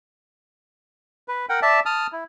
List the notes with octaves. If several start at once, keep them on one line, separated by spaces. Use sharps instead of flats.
B4
A#4 F#5 G5
D5 E5 A5
A5 D#6 F6
E4